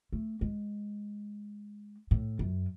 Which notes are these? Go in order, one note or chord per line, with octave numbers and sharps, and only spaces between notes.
A3
G#3
A2
F#2